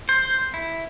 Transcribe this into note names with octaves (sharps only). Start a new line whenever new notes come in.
C5
E4